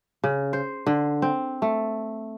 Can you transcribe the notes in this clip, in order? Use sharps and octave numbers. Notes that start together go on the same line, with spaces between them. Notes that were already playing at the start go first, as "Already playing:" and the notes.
C#3
C5
D3
C4
A3